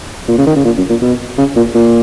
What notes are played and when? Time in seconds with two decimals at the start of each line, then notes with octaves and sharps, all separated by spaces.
0.28 A#2
0.38 C#3
0.47 D#3
0.56 C#3
0.65 A#2
0.78 F#2
0.90 A#2
1.02 B2
1.38 C#3
1.56 A#2
1.75 A#2